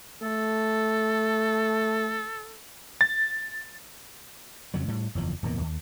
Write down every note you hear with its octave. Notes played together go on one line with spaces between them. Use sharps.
A3 A4
A6
F2 C#3 F#3
A2 G3
F#1 E2 F3
D1 E2 B2 A#3
D#2